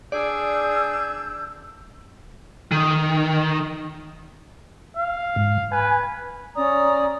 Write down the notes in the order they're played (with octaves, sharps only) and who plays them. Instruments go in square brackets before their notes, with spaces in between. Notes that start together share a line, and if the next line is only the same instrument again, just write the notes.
[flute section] D4 E6 G6 [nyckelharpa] G#4 [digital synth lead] D5
[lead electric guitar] D#3
[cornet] F5
[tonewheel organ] G#2
[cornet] B4 [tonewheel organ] G#5
[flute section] C#4 D5 A#5 D#6